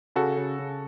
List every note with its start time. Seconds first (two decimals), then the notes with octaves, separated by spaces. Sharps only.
0.16 C#3 F#4 A4
0.37 C#3
0.59 C#3